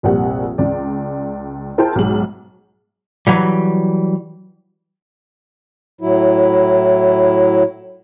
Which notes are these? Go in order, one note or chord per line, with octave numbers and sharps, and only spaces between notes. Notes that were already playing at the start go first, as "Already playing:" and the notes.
F1 A#1 G3 A#3 F#5
C#2 D5
E4 G#4 A#4 C5 G5 A5
B1 G#2 G#3 F#7
E3 F#3 G3
A2 F#3 E4